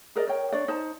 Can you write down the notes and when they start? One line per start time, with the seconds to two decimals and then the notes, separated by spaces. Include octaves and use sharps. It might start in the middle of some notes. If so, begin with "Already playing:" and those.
0.16 G#4 A#4 D5 D#5
0.27 A#4 C#5 G5
0.52 D4 C#5 D5
0.68 D#4 C5 A5